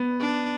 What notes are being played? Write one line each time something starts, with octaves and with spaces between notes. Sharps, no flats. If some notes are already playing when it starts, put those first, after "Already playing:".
Already playing: B3
D4